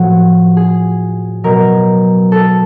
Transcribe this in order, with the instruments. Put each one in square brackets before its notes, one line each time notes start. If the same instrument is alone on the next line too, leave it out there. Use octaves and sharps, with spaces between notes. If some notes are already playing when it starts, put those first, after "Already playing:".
Already playing: [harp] A2 F3 F#4
G#4
B2 F#3 A#4
A4